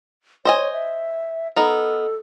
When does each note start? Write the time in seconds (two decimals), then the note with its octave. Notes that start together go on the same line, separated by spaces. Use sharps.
0.45 C5 C#5 D#5 G#5
0.73 E5
1.56 B3 D#4 A4 A#4